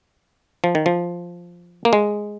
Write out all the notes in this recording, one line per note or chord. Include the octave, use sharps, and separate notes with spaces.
F3
D#3
F3
A#3
G#3